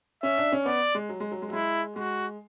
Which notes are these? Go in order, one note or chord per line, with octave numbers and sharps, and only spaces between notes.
C#4 E5
D4
C#4
B3 D5
G#3
F#3
G#3
F#3
G#3
F#3
G#3 E4
G#3 F#4